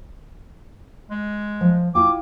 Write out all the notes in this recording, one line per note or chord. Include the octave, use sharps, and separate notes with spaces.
G#3
F3
E4 F4 G5 D6